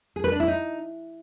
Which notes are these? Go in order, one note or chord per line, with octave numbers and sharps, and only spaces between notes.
G#4
B4
D4
E4
D#4